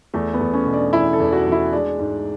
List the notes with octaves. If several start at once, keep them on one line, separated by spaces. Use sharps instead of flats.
E2 A3
B3
E2
C#4
B2
D4
E2 E4
A4
E2
F#4
E2
E4
G#3 D4
G#2